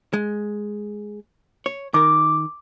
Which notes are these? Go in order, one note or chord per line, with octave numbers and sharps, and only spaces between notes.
G#3
C#5
D#3 A#4 D6